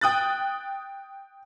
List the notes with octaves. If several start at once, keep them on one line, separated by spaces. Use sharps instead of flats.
G5 D#6 F#6 A6